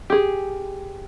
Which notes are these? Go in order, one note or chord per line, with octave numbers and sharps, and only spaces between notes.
G4 G#4